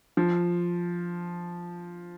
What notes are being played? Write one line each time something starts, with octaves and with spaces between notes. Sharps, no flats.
F3